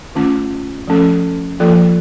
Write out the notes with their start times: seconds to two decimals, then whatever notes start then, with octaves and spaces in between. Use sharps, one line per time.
0.15 D#3 A3 C#4 F4
0.88 F3 A3 C#4 A4
1.60 F3 A#3 F4 A4